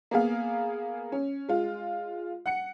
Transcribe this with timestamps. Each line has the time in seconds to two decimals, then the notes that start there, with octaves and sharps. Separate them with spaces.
0.11 A#3 B3 G#4 F5
1.12 C#4
1.49 G#3 F4
2.46 F#5 C#7